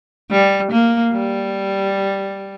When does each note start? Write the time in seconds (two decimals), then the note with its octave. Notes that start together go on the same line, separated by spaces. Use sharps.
0.31 G3
0.71 A#3
1.12 G3